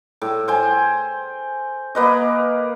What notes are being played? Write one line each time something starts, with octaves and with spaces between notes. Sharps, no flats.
A2
C5 G5 G#5
A#3 B4 D#5